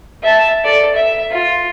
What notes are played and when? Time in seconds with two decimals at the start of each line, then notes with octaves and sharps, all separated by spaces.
0.23 E5 A5
0.64 A4 D5
0.96 E5
1.30 F4